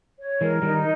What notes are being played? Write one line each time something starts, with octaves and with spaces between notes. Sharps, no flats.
C#5
E3 G#3 A#4
D#3 G3 D#4